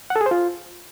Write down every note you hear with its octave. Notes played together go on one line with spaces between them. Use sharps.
F#5
A4
G#4
C5
F4